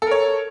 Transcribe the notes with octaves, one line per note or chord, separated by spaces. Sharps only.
A4 A#4 C#5